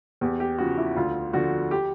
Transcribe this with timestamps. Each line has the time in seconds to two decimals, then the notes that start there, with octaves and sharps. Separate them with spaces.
0.21 E2 G4
0.40 G4
0.58 C#3 F3 F#4
0.77 E4
0.96 D2 F4
1.33 D3 F3 F#4
1.71 G4